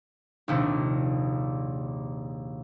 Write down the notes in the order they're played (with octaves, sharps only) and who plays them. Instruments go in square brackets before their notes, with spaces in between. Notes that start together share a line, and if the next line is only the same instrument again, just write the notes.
[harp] A#1 D#2 C3